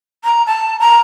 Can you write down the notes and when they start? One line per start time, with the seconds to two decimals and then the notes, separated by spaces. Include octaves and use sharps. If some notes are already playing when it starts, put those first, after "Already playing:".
0.24 A#5
0.47 A5
0.80 A#5